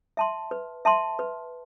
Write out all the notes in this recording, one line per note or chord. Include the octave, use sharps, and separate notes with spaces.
E5 A5 C6
B4
E5 A5 C6
B4